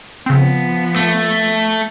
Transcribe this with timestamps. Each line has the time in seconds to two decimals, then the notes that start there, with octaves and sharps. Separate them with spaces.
0.26 C#3 F3 B3 C4
0.96 A3